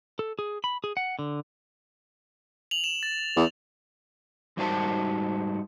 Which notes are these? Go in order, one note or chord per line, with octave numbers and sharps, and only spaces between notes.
A4
G#4
B5
G#4
F#5
D3
F7 F#7
E7
A6
E2
G#2 G3 D#4 F#4 C5 A5